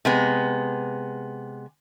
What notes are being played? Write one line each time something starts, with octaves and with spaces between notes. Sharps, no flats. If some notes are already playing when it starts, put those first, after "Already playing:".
C3 G#3 B3